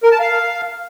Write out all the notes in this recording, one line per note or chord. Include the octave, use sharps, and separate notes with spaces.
A#4
A5
F5